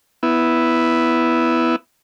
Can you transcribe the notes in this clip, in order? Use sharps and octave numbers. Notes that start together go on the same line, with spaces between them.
B3 E4